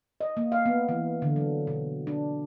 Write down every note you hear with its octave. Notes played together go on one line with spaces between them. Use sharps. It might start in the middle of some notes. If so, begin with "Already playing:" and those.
D#5
A#3
F5
B3
E3
D3
F#3
B2
D4